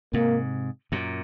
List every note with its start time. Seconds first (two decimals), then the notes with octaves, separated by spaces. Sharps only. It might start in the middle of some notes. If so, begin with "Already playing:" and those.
0.13 G#2 C3 A#3
0.92 F#2 A#2